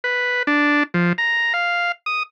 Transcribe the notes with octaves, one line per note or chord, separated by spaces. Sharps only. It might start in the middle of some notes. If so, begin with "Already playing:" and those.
B4
D4
F3
A#5
F5
D#6